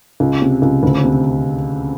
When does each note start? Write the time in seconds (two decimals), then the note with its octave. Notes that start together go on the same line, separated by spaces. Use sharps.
0.20 C#2
0.42 C3
0.62 C#2
0.83 D2
1.04 C3